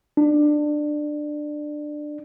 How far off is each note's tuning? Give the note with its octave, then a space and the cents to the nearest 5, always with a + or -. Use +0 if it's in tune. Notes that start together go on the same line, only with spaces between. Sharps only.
D4 +20